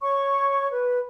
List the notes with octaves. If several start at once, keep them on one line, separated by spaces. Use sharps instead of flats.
C#5 C#6
B4